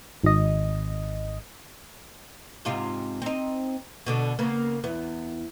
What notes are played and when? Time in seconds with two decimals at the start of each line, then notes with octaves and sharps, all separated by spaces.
0.23 G#1 D#5
2.65 G#2 C3 F4
3.22 C4 D#4
4.06 B2 D3 D4
4.39 C#3 A#3 B3
4.84 E2 B3